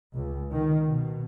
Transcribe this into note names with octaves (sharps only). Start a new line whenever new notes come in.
C#2
D#3
B2